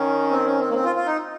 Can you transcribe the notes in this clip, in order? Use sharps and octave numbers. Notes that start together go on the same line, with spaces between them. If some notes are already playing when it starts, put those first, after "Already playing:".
Already playing: D#3 C#4
C4
C#4
C4
A#3
C4
F4
F4
D#4